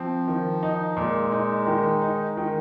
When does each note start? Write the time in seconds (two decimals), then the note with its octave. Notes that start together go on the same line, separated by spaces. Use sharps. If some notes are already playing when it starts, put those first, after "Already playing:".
Already playing: F3 C4
0.28 D#3
0.63 D#4
0.97 A#2 G#3
1.32 D#4
1.67 D#3
2.02 D#4
2.37 D#3 G#3